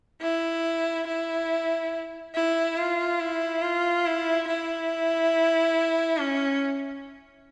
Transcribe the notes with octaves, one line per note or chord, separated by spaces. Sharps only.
E4
E4
E4
F4
E4
F4
E4
E4
C#4